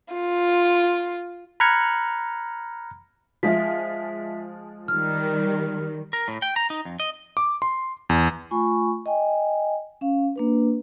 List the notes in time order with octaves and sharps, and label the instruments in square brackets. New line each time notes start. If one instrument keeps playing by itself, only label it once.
[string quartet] F4
[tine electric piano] A#5 B5 F6 F#6 G#6 C#7
[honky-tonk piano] F3 G#3 F4 [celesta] E5 B6
[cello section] D#3 G3 [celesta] F6
[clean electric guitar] A#4
A2
G5
A#5
D#4
F2
D#5
[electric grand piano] D6
C6
E2
[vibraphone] A3 F4 G#5 B5 C#6
D#5 G5 G#5
C#4 F5
A#3 D4 B4